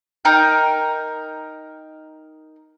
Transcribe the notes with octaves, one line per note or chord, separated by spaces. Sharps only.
D#4 A#4 G5